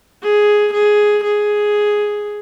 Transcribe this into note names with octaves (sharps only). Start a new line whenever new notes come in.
G#4
G#4
G#4